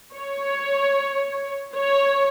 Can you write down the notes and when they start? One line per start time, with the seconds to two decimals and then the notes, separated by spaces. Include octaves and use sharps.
0.17 C#5
1.76 C#5